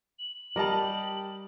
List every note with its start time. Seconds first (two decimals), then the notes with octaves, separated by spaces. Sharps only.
0.19 F#7
0.56 G3 G4 A#4 D#5 A5